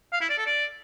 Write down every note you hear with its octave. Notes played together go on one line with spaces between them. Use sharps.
F5
E4
D5
A4
D5